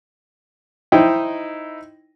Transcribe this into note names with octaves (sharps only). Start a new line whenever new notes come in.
D#4 E4 C5 D#5 G5